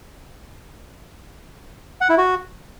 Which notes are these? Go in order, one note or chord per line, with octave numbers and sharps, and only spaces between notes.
F#5
E4
F#4